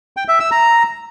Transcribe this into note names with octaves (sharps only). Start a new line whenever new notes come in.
G5
E5
E6
A#5